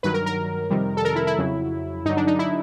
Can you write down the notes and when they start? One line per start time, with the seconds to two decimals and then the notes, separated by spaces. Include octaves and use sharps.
0.03 G2 D#3 F#3 B4
0.14 A#4
0.26 A#4
0.70 F2 C3 D#3 G3
0.97 A4
1.05 A#4
1.16 E4
1.27 E4
1.39 F2 C#3 F#3
2.05 G2 D3 F#3 D#4
2.17 D4
2.27 D#4
2.39 E4